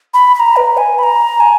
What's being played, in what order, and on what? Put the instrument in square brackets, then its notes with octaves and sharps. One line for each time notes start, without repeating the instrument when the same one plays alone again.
[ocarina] B5
B5
A#5
B4
G#5
B5
A#5
G#5